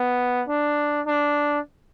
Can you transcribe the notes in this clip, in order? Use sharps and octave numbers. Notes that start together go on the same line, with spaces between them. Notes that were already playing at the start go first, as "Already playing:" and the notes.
Already playing: B3
D4
D4